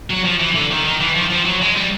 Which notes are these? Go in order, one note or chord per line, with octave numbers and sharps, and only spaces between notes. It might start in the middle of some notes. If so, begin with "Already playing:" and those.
F#3
F3
E3
D3
D#3
D#3
E3
F3
F3
F#3
G#3
G3